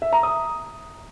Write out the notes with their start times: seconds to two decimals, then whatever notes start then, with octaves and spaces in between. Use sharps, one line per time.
0.02 E5
0.13 A#5
0.23 D#6